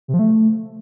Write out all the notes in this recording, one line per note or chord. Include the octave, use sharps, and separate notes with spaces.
C3
F3
A3